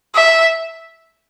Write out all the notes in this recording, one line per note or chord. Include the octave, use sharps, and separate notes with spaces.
E5